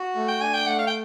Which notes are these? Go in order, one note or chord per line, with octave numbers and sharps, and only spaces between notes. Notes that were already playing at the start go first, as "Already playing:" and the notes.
Already playing: F#4
A3
G5
D4 G#5
G5
A3 F#5
F5
G5